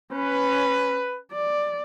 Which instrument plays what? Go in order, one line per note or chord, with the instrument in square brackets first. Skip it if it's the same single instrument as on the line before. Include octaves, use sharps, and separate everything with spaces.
[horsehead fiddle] C#4 [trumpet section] B4
[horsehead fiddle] D5